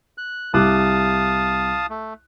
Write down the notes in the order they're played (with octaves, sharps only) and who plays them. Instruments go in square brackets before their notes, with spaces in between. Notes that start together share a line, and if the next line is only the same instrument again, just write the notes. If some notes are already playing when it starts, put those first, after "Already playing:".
[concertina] F#6
[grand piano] C2 D6 F#6 [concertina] F5 A5 D#6
[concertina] A3